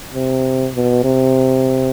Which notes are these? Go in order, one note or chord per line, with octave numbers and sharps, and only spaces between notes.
C3
B2
C3